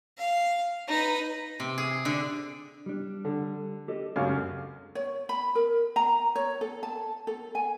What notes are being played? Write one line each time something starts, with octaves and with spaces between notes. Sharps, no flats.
F5
D#4 B4
C3
G#4
D3
G3 D4
D3
G4 A4 D#5
C#2 F#2 C#4 G4 A4 F5
C#5
B5
A#4
A#5
C#5
A4
A5
A4
G#5